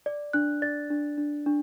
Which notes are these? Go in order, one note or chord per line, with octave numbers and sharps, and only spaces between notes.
D5
D4 F#6
D5 A6
D4
D4
D4